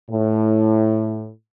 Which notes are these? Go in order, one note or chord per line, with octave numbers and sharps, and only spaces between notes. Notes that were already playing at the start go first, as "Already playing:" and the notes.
A2